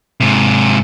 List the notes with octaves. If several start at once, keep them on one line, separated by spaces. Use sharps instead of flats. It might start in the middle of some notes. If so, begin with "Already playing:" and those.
G#2 C3